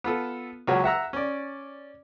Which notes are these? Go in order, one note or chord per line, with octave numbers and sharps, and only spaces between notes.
B3 F4 A4
C#2 A#2 F#3 C#4 F#4 C#5
E5 F#5 A#5 E6
C#4 D5